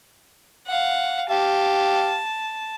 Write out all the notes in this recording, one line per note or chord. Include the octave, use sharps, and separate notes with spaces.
F5 F#5
G4 F5 A5